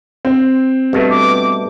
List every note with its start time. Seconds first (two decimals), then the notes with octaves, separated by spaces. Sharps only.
0.25 C4
0.93 G2 B2 A3
1.11 D6